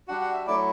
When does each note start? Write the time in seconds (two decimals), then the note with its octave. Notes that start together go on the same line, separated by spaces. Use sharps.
0.08 G3 D4 F#4 F#5
0.21 F#5
0.33 E5
0.47 F#3 A3 E4 D5